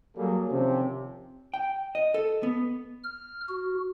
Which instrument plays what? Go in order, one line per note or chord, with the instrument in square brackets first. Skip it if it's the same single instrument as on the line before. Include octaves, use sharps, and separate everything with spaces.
[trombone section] F#3 G3 A#3 G#4 A4
C3 D#3 F3 C4 C#4
[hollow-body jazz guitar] G5
D#5
A4
B3
[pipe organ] F6
F#4